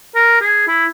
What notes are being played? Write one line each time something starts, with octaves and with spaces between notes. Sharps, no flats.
A#4
G#4
E4